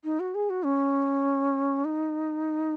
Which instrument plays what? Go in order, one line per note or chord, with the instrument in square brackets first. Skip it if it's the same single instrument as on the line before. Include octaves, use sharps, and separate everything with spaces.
[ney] D#4
F#4
G#4
F#4
C#4
D#4